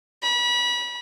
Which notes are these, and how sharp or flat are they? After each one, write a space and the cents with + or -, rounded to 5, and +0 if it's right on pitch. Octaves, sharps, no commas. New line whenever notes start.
B5 -30